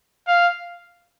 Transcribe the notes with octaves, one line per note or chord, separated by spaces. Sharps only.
F5